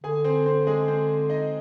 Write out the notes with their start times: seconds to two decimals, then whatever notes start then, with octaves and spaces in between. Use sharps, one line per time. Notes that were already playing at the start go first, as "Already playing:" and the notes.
0.04 D3 G#4 G#5
0.24 C4 C5
0.46 C4 C5
0.67 G#3 G#4
0.88 C4 C5
1.30 D#4 D#5